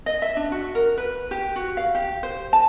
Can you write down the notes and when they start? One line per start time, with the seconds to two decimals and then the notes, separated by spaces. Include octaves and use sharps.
0.06 D#5
0.22 E5
0.37 D4
0.52 F#4
0.75 A#4
0.98 B4
1.31 G4
1.56 F#4
1.77 F5
1.95 G4
2.23 C5
2.53 A5